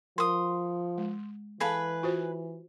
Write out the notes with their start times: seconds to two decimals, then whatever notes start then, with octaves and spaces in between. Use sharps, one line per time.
0.18 F3 A#4 C6 D#6
0.98 G#3
1.60 E3 G#4 A4 B4 F5 A5 B5
2.03 F4 F#4 C5